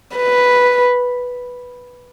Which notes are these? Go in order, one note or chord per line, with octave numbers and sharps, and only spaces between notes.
B4